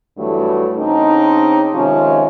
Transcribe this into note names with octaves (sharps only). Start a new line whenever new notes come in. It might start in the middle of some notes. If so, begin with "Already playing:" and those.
G2 E3 F#3 A3
C#3 C4 D4 D#4
C3 D#3 F3 G#3 C#4